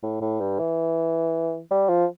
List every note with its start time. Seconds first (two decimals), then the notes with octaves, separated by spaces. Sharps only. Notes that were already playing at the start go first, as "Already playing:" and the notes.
0.03 A2
0.21 A2
0.40 G2
0.59 E3
1.71 G3
1.89 F3